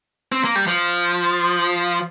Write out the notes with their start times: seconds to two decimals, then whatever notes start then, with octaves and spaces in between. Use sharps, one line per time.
0.32 C4
0.44 A#3
0.56 G3
0.67 F3